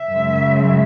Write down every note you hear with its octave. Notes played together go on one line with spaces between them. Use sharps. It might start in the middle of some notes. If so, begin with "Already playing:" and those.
Already playing: E5
F#2 C#3 G#3